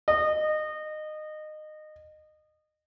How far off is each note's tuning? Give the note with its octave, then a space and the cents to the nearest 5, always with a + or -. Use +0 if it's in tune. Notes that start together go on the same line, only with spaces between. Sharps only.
D#5 -20